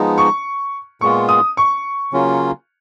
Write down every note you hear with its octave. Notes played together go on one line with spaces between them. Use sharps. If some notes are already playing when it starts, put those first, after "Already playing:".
Already playing: F3 G#3 B3 D#4
C#6
A#2 G#3 B3 F4 C#6
D#6
C#6
C#3 F#3 A#3 C#4 F4